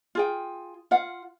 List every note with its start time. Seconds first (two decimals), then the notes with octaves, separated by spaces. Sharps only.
0.15 F4 G#4 G5
0.91 F4 F5 F#5